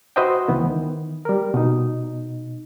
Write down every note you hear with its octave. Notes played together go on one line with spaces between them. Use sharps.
F#4 B4 C5 D#5 E5 G5
C#2 E3 B3
D#3
G3 A#4
B2 D#4